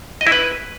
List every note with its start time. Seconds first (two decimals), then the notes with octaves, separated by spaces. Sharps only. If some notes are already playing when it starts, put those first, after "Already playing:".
0.21 D#5
0.27 E4
0.32 B4